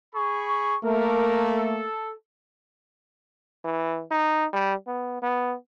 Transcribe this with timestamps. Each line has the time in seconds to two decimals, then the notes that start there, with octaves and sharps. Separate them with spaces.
0.15 G#4 B5 C#6
0.84 A3 A#3 A#4
1.57 A4
3.64 E3
4.11 D#4
4.53 G3
4.87 B3
5.22 B3